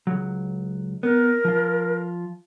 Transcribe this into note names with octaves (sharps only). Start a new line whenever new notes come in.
C#2 F#3
B3 A#4
F3 F4